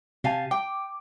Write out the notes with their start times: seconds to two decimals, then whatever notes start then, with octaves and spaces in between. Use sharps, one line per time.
0.24 C3 G4 F5 G#5 A5
0.51 G5 D6